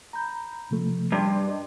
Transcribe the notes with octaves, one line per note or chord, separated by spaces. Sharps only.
A#5 B5 G6
C3 F3 A3
G2 D5 C6
D#5